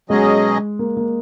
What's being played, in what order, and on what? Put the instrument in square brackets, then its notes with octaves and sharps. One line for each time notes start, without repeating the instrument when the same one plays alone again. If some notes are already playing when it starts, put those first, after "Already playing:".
[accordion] B2 F#3 C#4 G#4 D#5 [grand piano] G#3
[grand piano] A#3
A#3